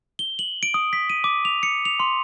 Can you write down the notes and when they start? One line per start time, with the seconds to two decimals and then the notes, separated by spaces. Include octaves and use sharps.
0.19 G7
0.39 F#7
0.63 D7
0.74 D#6
0.93 B6
1.10 D#7
1.24 D6
1.45 F7
1.63 C#7
1.85 F7
2.00 C6